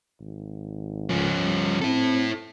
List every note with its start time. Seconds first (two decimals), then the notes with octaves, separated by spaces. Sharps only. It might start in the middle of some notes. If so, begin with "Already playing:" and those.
0.20 G#1
1.10 C#2 F3 C#4
1.41 G3
1.81 C4 E4 A4